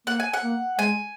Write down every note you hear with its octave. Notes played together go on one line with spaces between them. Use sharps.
A#3 F#5
G#5
F#5
A#3
G#3 G#5